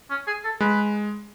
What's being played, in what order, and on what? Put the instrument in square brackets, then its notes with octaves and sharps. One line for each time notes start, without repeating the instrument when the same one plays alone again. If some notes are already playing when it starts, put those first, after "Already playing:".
[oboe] C#4
G#4
A4
[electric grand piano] G#3 [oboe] B4